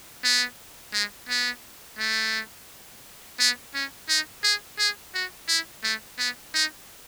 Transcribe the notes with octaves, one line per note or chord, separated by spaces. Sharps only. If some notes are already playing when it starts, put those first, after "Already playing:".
B3
G#3
B3
A3
B3
C#4
D#4
G#4
G#4
F#4
E4
A3
B3
D#4